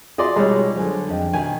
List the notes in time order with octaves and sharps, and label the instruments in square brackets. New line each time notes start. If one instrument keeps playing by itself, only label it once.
[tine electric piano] F4 F#4 [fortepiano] G#4 D5 C6 [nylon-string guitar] D#5
[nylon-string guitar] B2 D#4 C#5 [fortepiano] G3 G#3
[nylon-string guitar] D3 F#3 [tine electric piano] G#4 C5 G#5
[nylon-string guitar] F2 [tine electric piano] D4 D#5 G5
[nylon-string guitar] B2 D#3 [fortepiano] G#5